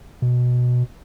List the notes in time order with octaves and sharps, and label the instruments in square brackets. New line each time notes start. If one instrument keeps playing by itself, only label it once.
[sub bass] B2